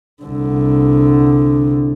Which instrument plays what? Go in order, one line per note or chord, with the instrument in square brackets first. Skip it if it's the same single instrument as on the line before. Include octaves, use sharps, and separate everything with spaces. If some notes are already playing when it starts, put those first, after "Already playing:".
[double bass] C2 D3